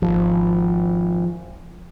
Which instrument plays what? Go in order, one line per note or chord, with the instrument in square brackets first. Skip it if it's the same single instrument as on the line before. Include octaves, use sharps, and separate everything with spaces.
[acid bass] G#1 [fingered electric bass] F3